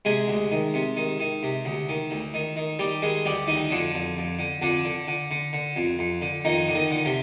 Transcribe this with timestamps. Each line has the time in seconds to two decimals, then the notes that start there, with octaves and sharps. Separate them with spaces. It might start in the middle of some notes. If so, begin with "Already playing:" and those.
0.05 C3 G#3 G#4
0.28 D2
0.52 D#3
0.74 C3
0.96 D#3
1.20 D#3
1.43 C3
1.65 D2
1.89 D#3
2.11 D2
2.34 D#3
2.56 D#3
2.79 D#3 G3 G4
3.02 D#3 G#3 G#4
3.26 D2 G3 G4
3.47 D2 D#3 D#4
3.71 F2 D3 D4
3.94 F2
4.17 F2
4.39 D3
4.62 F2 D3 D4
4.85 D3
5.08 D3
5.31 D3
5.53 D3
5.76 F2
5.99 F2
6.22 D3
6.45 F2 D#3 D#4
6.68 D3
6.75 D#3 D#4
6.91 D3
7.06 C3 C4